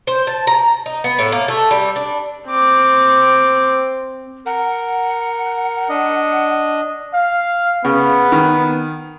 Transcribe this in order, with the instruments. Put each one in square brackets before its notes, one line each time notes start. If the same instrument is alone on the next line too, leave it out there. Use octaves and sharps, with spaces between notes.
[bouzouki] C5
A5
A#5
D#4
B3
A2
A#3
A3
G3
D4
[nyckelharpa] C4 D6
[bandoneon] A#4 [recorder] F#5
[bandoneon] D4 D#5
[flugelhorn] F5
[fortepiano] C#3 [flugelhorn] B3
[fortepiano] D#3